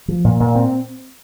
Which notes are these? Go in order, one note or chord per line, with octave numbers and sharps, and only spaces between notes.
F3
A#2
A#2
C4